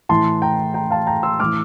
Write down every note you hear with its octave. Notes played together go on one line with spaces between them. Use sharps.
A2 E3 A5 C6
G5 A#5
G5 A#5
F5 A5
G5 A#5
C6 E6
A2 E3 D6 F6